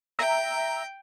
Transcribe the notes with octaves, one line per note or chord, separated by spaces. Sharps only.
E5 G5 A#5